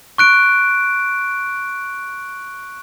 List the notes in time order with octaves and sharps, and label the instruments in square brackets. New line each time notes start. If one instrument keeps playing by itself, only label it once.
[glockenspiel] C#6 F#6 D7